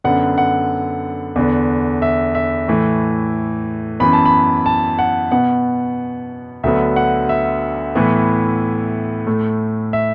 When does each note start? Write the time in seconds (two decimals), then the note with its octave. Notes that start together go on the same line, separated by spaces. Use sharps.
0.04 F#2 D3 B3 F#5
0.38 F#5
1.36 E2 D3 B3
2.02 E5
2.35 E5
2.68 A2 E3 A3
4.00 F#2 E3 B3 B5
4.13 A5
4.26 B5
4.66 A5
4.99 F#5
5.31 B2 B3 F#5
6.63 D2 D3 F#3 B3 E5
6.96 F#5
7.29 E5
7.95 A2 E3 B3
9.27 A2 A3
9.93 E5